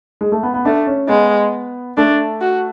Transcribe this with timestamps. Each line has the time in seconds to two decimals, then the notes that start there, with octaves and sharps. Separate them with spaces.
0.21 G#3
0.32 A3
0.43 B3
0.54 B3
0.65 A3 D4
0.87 C#4
1.09 G#3 B3
1.97 A3 D4
2.41 F#4